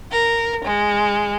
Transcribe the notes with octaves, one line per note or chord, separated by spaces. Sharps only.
A#4
G#3